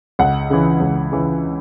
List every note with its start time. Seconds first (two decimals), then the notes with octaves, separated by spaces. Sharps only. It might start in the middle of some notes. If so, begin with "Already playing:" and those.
0.19 C#2 F#5
0.50 C#3 E3
0.80 C#2
1.12 C#3 E3